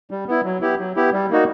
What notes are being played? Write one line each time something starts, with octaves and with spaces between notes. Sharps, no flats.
G3
B3 E4
F#3
B3 E4 G4
F#3
B3 E4 G4
G3
A#3 D#4 F#4